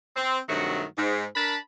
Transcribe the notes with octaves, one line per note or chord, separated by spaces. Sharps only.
C4
G2 C3 D#3 F#3 A3 F#4
G#2
D4 A#4 A5 B5